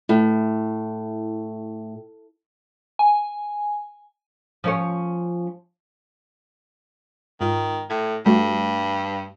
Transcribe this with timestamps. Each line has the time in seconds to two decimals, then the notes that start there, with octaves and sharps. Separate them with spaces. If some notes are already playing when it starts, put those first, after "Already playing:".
0.09 A2 E4
2.99 G#5
4.64 F3 C#4 C#5
7.41 G#2 D#3 F4
7.90 A2 G#6
8.26 G2 G3 A3 F#4